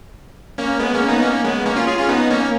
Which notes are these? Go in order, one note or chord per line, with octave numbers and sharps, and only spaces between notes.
A#3 C#4
G#3 B3
A#3 C#4
B3 D#4
A#3 C#4
G#3 B3
A#3 C#4
C#4 F4
F4 G#4
C#4 F4
B3 D#4
A#3 C#4